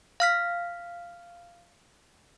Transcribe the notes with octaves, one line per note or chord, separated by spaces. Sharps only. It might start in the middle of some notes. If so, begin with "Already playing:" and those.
F5 F6 B6